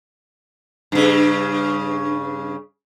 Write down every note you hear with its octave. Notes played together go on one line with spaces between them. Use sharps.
G2 C#3